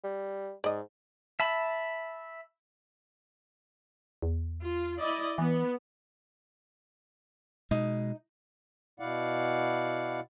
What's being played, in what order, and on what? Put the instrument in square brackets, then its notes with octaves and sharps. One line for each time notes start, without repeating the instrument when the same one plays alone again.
[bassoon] G3
[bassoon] G#2 [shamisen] D5 D#5
[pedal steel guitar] E5 A5 B5
[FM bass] E2
[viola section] F4
E4 D5 D#5
[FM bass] E3 [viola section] B3
[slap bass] B2 G#3 [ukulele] D#4
[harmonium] B2 E4 D5 F5 F#5